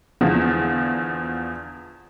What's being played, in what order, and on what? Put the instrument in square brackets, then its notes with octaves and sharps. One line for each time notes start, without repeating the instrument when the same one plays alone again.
[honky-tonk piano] E2 D3 F3